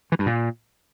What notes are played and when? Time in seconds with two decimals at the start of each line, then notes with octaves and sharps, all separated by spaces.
0.12 E3
0.19 G2
0.26 A#2